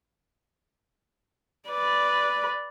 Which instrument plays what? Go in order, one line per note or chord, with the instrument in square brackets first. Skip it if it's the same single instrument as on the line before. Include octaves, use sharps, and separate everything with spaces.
[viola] B4 D5